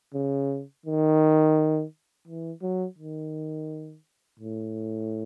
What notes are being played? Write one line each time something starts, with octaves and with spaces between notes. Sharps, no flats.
C#3
D#3
E3
F#3
D#3
A2